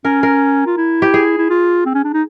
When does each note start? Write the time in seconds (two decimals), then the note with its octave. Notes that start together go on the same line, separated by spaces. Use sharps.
0.05 C#4 A#4
0.23 A#4
0.67 F4
0.77 E4
1.02 G4
1.14 G#4
1.38 E4
1.50 F4
1.86 C4
1.94 C#4
2.04 D4
2.14 D#4